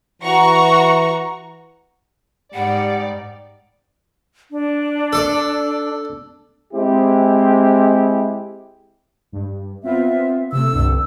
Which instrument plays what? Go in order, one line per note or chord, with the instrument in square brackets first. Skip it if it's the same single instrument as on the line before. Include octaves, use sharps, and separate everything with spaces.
[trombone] E3 [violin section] F#4 A#5 C#6
[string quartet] G#2 D#4 [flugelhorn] G3 [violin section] D5 [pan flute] F#5
[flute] D4
[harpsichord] A4 D5
[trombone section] G#3 C4 E4 G4
[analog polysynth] G2
[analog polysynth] B3 C4 F4 [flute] E5
[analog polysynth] C3 A3 [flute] E6
[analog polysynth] C2 G2 D3